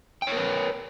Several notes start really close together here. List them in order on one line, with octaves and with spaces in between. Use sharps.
G5 C#5 A#4 B4